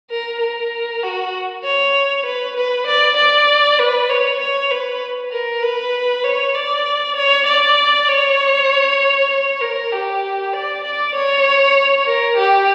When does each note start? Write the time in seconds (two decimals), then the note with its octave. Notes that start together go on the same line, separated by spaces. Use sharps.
0.10 A#4
0.41 A#4
1.03 F#4
1.64 C#5
2.26 B4
2.56 B4
2.87 D5
3.17 D5
3.79 B4
4.09 C#5
4.40 C#5
4.71 B4
5.32 A#4
5.62 B4
6.24 C#5
6.55 D5
7.16 C#5
7.46 D5
8.08 C#5
9.30 C#5
9.61 A#4
9.92 G4
10.53 D5
10.84 D5
11.15 C#5
12.06 A#4
12.37 G4